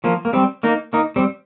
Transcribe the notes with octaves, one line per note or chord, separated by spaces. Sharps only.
F3 A#3
A#3
G3 C4
A#3 D#4
A#3 D#4
G3 C4